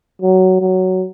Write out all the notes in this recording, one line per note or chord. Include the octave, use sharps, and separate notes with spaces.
F#3
F#3